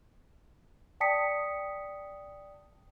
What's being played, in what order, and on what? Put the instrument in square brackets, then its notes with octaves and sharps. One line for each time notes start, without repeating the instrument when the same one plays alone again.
[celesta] D5 G5 A5 D#6 B6 C#7